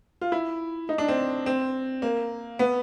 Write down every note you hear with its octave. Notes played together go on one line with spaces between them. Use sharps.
F4
E4
D#4
D4
C4
C4
A#3
B3